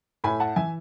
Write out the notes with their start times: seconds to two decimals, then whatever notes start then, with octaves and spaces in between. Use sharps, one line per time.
0.24 A2 G#5 B5
0.40 F#5 A5
0.56 E3 E5 G#5